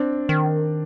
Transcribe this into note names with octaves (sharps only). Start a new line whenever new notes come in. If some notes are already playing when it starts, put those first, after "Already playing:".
Already playing: C4 D4
D#3